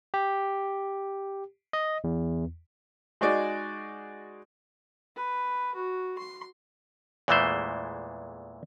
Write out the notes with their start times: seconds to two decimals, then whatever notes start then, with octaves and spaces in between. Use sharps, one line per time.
0.14 G4
1.73 D#5
2.04 E2
3.21 G#3 D#4 F#4 G#4 D5
5.16 B4
5.75 F#4
6.18 C6
7.28 E2 A#2 E3 G#3 A3 C5